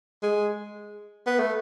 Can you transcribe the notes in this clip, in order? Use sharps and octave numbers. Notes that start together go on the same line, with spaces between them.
G#3
B3
A3